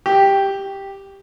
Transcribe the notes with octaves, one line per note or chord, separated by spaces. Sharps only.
G4